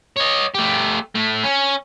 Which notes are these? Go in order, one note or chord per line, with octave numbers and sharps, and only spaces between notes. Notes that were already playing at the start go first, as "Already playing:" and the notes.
C#5 D#5
A3 G4
A2 A3
C#4